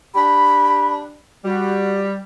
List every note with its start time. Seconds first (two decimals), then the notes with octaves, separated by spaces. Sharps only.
0.15 D4 G4 B5
1.45 G3 F#4